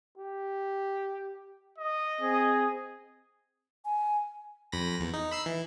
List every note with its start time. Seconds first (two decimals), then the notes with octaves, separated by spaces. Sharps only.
0.18 G4
1.78 D#5
2.21 C4 G#4
3.85 G#5
4.72 F2 B5 A#6
5.00 E2
5.14 D#4
5.31 B5 E6 C7
5.46 E3